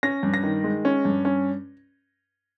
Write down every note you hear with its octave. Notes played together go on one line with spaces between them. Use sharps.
C#4 A#6
G2
A#6
D#3
G#3
C#4
G2
C#4